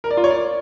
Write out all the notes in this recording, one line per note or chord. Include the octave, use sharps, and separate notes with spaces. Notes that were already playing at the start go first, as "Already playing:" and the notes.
A#4
D5
F4
C#5
D5